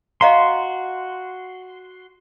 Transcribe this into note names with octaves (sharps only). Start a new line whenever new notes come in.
F#4 D#5 F5 A#5 C6